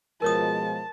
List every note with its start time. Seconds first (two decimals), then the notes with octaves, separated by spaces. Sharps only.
0.22 B2 F3 G#3 A#4 C#5 A5 D#6